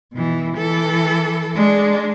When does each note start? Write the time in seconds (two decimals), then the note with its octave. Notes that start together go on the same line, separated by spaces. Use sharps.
0.13 B2 E3
0.58 E3 A4
1.55 G#3 D4